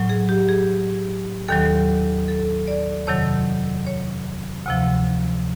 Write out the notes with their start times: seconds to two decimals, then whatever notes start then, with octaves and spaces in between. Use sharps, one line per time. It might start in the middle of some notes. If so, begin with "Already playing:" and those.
Already playing: A2 F#3
0.10 G#4
0.29 G4
0.49 G#4
1.48 D#2 D#3 F#3 A4
2.28 A4
2.67 D5
3.07 F2 C3 D#3 F#3 C#5
3.87 C#5
4.66 D2 C3 F3